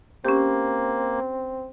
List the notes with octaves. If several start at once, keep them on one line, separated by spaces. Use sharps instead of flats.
A#3 C4 C#4 G4